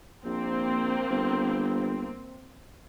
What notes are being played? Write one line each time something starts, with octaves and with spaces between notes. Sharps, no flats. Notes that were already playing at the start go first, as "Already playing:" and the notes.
A#1 A#3 C4
G1